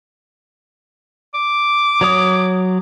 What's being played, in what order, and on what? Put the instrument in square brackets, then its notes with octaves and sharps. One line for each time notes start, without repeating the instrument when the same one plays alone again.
[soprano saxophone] D6
[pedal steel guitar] F#3 C#5 D#6